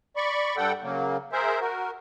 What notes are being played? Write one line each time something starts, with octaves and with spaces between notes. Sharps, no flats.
D5 B5 C#6
G2 G3 A4 F#5 G5
C#3 F#3 A#3
G#4 A#4 C5 E5
F#4 A#4